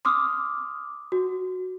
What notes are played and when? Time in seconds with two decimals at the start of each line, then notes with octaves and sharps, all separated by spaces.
0.05 C6 D6 D#6 F6
1.12 F#4